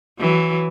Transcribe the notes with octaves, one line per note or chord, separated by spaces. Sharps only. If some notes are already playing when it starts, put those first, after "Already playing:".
E3 F#3